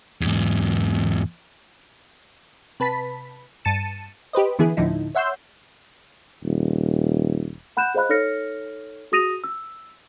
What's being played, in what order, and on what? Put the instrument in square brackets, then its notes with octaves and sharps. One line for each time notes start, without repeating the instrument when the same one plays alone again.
[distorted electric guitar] E2 G#2
[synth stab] C3 B4 A5 B5 B6
G2 A5 A6 C#7 D#7 E7
G4 B4 C5 D#5
D3 E3 B3 E4 G#4
D2 A2 D3 F3 D#4 E4
C#5 E5 F#5 C6 E6 G6
[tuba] D#1
[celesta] F#5 B5 F#6 G6 E7
G#4 C5 D#5 F5 B5 F#6
D#4 A4 C#5 F6 A#6 C#7
F#4 G#4 D#6 A#6 D#7 F7
E6